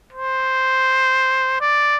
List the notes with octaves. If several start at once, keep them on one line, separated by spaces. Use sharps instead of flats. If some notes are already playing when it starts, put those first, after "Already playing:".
C5
D5